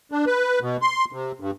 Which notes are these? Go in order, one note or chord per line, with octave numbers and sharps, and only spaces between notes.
D4
B4
B2
C6
C3
G2